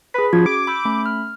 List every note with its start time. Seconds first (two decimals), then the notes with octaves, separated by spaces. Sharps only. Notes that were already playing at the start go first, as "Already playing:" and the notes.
0.14 G#4 B4 B5 B6
0.33 F3 C#4 F#4 G#6
0.46 D6
0.67 B5 E6 G6
0.85 A3 C#4 B5
1.06 F6